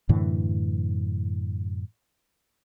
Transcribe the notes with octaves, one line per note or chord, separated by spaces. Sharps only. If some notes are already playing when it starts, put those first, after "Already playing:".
F#2 A2 D3 E3